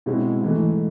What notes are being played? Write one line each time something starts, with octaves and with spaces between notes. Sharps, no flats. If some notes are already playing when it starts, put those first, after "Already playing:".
B2 G#3 C4 E4
G#2 E3 A3